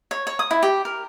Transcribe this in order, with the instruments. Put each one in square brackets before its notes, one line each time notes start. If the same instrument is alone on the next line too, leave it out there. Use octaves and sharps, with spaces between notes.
[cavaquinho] C#5
C#5
D#6
E4
G4
A#4